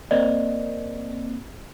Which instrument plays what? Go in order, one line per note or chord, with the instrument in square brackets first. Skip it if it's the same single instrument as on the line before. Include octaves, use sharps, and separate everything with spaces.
[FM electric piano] A#3 C4 [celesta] D5 D#5